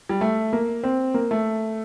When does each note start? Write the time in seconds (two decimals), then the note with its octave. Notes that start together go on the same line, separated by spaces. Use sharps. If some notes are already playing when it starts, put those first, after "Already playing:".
0.09 G3
0.21 A3
0.53 A#3
0.83 C4
1.14 A#3
1.31 A3